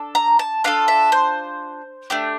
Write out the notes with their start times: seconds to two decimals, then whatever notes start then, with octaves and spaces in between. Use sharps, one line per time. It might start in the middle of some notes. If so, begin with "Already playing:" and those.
Already playing: D4 A4
0.15 A#5
0.39 A5
0.64 D4 F4 A4 F5
0.88 E5
1.12 C5
2.10 A3 D4 G4